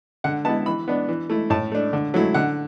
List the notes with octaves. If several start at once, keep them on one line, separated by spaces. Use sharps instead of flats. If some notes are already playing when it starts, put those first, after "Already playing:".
D3 F#5
B3 E4 A5
E3 B5
B3 D4
E3
A3 E4
A2 A5
A3 D4
D3
F#3 A3 E4
D3 F#5